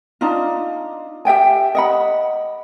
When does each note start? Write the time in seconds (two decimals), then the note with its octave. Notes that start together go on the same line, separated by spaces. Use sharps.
0.21 D4 D#4 F4
1.25 G4 E5 G5 G#5
1.75 D#5 F#5 B5